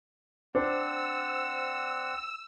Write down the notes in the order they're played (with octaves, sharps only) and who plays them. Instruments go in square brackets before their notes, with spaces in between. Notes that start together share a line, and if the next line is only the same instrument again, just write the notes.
[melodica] C4 F#5 [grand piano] D4 [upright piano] C5 [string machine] E6